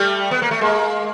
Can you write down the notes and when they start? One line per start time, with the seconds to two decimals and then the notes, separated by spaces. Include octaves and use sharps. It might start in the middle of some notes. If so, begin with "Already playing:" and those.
Already playing: G3 A3
0.31 B3
0.42 A#3
0.51 A3
0.61 G#3 A#3